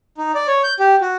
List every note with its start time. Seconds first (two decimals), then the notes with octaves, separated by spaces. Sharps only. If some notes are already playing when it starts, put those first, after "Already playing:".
0.18 D#4
0.35 D5
0.48 C#5
0.64 G6
0.80 G4
1.01 F#4